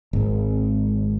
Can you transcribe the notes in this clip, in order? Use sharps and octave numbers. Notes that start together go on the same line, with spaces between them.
G#1